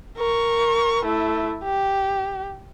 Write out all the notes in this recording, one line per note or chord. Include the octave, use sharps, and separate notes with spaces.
A#4 C#6
A3 E4
G4